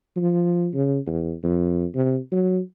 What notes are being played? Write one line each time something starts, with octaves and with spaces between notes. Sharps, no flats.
F3
C#3
E2
F2
C3
F#3